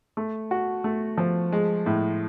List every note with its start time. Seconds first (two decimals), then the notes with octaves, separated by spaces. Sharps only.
0.17 A3
0.51 F#4
0.84 A3
1.18 F3
1.52 G#3
1.86 A2